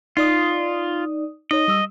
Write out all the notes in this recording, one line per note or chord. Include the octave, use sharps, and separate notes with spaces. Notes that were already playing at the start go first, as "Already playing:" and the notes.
D#4 F4 D5 D#6
D#4 C#5 D#5
G3 D#6 E6